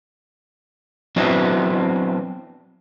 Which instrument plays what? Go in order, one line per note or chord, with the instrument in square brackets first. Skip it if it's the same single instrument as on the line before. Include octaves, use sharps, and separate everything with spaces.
[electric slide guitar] F#3 B3 C4 D4 E4